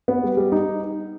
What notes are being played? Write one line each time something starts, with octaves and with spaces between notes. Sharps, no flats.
B3
G3
G3
D#4